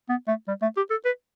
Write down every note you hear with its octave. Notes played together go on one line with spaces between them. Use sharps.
B3
A3
G3
A3
G4
A4
B4